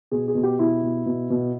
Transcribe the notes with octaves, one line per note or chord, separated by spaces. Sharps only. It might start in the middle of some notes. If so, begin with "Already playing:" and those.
B2 G#4
G#4
B2
G4
B2 E4
B2
B2
B2